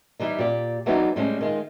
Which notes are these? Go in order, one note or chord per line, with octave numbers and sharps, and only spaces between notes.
E3 G3 D#4
A#2 G4 D5
E3 F#3 B3 C4 D4 D#4
A2 G3 G#3 C4 C#4
D#3 G#3 F4